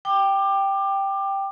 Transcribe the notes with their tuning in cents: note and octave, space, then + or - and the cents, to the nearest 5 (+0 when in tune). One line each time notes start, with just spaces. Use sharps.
G5 +0 D6 +20